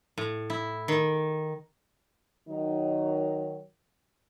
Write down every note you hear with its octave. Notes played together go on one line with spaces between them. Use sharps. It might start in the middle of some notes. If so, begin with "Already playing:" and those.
A2
E4
D#3
D#3 F#3 D#4